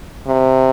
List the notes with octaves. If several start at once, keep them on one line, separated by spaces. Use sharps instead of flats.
C3